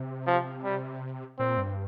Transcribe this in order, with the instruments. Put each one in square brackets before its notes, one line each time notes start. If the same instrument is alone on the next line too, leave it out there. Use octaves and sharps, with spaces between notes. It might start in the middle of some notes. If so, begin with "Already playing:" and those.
Already playing: [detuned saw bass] C3
[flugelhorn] F3
G3
[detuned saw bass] A#2 [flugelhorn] C4
[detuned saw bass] G2